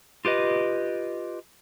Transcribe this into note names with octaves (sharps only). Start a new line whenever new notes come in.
F4 G4 B4 D#5